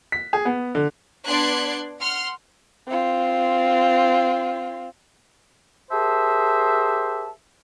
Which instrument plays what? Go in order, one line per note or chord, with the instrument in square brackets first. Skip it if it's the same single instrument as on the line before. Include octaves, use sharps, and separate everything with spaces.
[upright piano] B6
G#4
B3
D3
[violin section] B3 D4 D5 C6 F#6 G#6
F#5 C6 F6
[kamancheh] C4 F4
[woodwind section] G4 G#4 A#4 C5 E5 A5